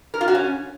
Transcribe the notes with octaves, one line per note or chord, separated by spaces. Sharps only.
A#4
F4
F#4
C#4